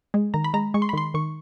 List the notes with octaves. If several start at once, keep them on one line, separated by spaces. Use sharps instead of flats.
G#3
D#3 A#5
B5
G#3 A#5
G#3 C#6
C6
B5
D#3 C6
D#3 C#6